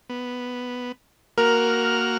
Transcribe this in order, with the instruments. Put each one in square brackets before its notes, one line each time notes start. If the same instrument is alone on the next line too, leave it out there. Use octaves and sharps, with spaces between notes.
[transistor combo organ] B3
[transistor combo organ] A#3 F#4 F6 [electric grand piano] A#4